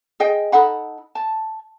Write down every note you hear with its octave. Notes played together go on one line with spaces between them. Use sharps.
G#4 D#5 G5
D#4 A4 F#5 B5
A5